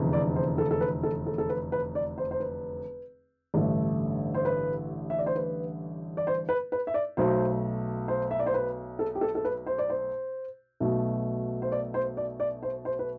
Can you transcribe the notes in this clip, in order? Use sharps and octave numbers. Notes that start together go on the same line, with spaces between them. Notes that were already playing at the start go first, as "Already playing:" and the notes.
Already playing: F1 E2 D3
D5
C5
A4
A4
B4
A4
A4
A4
B4
B4
D5
C5
C5
B4
A1 G2 D3 A3
C5
B4
E5
D5
C5
B4
D5
C5
B4
B4
E5
D5
B1 B2 A3 C5
C5
E5
D5
C5
B4
A4
G4
A4
A4
B4
C5
D5
C5
B1 B2 A3
C5
D5
C5
D5
D5
C5
C5
B4